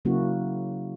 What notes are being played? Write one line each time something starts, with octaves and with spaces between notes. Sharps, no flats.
C#3 F#3 A#3 C#4 E4 F#4